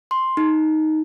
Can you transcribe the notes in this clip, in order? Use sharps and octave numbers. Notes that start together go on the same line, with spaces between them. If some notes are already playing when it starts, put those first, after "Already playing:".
C6
D#4